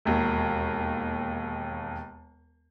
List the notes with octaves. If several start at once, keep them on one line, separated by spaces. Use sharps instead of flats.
E1 D#2